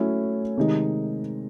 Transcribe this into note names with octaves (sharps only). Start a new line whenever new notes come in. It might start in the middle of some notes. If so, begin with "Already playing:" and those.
Already playing: F#3 A3 C#4 E4
C3 D#3 G#3 D#4